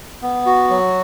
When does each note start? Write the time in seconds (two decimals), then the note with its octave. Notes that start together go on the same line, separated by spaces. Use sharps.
0.22 B3
0.46 F#4
0.70 F#3